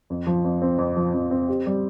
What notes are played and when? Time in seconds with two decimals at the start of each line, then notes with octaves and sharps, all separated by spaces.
0.10 F2
0.27 F3
0.44 F2
0.62 C4
0.78 F2
0.96 F3
1.14 F2
1.31 C4
1.49 G4
1.66 G3